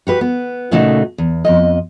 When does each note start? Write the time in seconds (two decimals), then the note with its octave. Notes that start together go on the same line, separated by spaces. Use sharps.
0.07 F#4 G4 B4
0.21 B3
0.71 A#2 C#3 A3 D#4 F#4
1.18 E2
1.45 F2 G#2 D#5